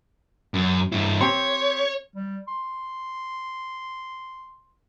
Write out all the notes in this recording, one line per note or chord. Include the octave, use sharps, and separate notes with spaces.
F#2
G2 E4
C4 G4 C#5 C6
G3
C6